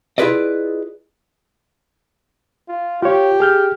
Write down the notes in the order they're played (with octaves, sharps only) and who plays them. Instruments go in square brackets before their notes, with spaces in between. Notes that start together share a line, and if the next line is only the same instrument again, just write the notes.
[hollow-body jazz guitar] E4 F4 G#4 B4 D5 D#5
[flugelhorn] F4
[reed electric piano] F4 C#5 [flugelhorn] G4
[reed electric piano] G#4 F6 G6